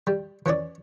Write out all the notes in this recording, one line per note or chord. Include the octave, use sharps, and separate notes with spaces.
G3
E3 C#4 C#5 D5